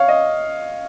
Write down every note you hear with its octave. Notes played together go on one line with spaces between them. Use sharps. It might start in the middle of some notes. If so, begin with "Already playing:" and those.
Already playing: C#5 F5
D#5